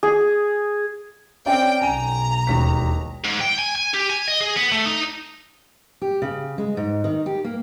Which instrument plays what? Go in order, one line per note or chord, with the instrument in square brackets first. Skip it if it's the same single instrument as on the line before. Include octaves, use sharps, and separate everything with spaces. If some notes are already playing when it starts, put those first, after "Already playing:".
[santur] G#4
[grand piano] C4 C#4 D5 [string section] G5
[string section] B1 A#5 [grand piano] G#5 D#7
[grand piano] E1 D#2 B6
[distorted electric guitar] G#2
G5
G#5
G#5
G4
G#5
D#5
G#4
B3
A3
D#4
[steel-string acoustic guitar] G4
C#3
G#3
G#2
D#3
G4
A#3